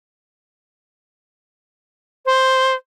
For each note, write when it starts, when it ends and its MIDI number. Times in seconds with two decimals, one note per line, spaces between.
2.26 2.74 72